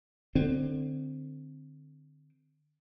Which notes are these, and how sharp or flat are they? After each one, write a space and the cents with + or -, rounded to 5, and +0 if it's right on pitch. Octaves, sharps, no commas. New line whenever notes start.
D3 +25 C4 +0